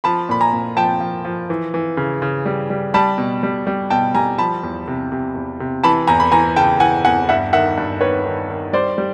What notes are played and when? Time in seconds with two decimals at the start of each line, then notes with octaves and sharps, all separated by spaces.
0.04 F3 A5 B5
0.29 A#2 B5
0.41 G#5 A#5
0.53 A#2
0.76 F3 G5 A5
1.00 F3
1.25 F3
1.50 E3
1.74 E3
1.97 C#3
2.22 C#3
2.46 G3
2.70 G3
2.94 G3 A5 B5
3.18 B2
3.43 G3
3.67 G3
3.90 B2 G5 A5
4.14 G3 G#5 A#5
4.38 F3 A5 B5
4.63 E2
4.88 C3
5.12 C3
5.35 E2
5.60 C3
5.84 E3 A5 B5
6.07 E2 G#5 A#5
6.20 B5
6.32 E3 G#5 A#5
6.56 C#3 G5 A5
6.80 E3 F#5 G#5
7.05 E2 F#5 G#5
7.29 G2 E5 F#5
7.53 D#3 E5 F#5
7.78 G2
8.01 D#3 B4 C#5
8.25 D#3
8.50 D#3
8.73 G3 C5 D5
8.98 G3